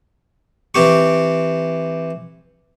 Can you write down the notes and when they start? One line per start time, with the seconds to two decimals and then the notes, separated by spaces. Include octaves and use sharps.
0.74 E3 C4 G4 C#6